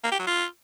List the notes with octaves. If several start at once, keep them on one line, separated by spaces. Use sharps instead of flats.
A#3
G4
F#3
F4